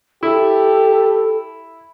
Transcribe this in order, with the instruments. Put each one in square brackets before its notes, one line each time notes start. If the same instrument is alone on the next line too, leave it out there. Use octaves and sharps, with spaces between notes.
[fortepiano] E4 [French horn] G4 [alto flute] A4